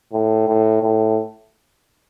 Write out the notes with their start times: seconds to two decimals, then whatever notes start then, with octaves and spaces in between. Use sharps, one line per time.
0.13 A2
0.48 A2
0.83 A2